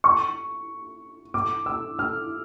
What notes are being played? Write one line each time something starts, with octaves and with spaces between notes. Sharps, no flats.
C#6
D6
E6
F6